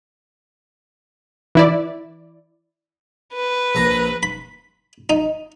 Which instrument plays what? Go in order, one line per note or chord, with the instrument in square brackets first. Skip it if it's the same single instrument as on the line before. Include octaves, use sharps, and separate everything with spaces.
[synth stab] E3 E4 D5
[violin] B4
[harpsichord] A#1 A#5
B5
D#4